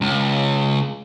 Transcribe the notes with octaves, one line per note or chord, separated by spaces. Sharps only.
C#2